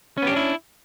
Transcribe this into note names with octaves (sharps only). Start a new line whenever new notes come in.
B3 C#4 D4 E4 G4